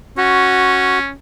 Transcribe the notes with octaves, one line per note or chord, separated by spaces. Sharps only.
C#4 F#4